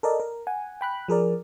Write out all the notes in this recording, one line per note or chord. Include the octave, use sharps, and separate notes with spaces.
A4 A#4 D5 D#5
A#4
F#5 G#5
G5 B5 F#6
F3 G#4 A#4 D5